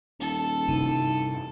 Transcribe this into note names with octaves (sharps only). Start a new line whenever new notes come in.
D#1 A4
G2 C3 E3 D#4 A5 D#7